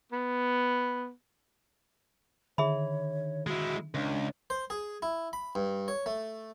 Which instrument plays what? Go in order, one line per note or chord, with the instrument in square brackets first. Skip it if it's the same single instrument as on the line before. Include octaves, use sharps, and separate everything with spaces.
[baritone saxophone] B3
[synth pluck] D3 D#3 [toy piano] G#4 E5 B5 [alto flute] C#5
[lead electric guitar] G#3 E4 [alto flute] F#4
[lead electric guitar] C#2 [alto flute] D4
[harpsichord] C5
G#4
E4
B5
G2
C#5
A3